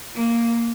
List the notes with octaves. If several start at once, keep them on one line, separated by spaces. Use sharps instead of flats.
A#3